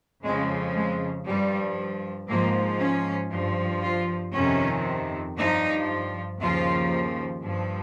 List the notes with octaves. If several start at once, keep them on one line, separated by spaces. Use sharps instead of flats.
F2 C#3 F3 G#3
G#3
G2 F3 G3
G#2 F3 A#3
C#4
G2 F3
F4
F2 C3 D#3 C#4
G2 F3 D#4
D#2 C#3 F3 F4
G2 F3